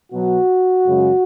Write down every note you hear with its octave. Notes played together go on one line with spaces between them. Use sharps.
B2 F#3 F#4
F#2 C#3 G#3